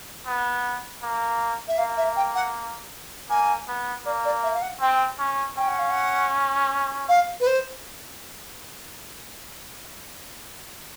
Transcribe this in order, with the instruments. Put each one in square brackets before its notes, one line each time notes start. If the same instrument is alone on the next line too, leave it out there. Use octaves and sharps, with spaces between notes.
[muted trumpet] B3
A#3
[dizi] E5
[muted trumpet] A#3 [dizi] F5
[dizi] E5
G5
F#5
[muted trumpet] A#3 [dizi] G#5
[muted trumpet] B3
[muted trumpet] A#3 [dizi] D5
[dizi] D5
E5
F5
F#5
[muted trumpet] C4 [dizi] G5
[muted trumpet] C#4
[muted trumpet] C#4 [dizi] G5
[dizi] F#5
F5
F#5
F5
B4
C5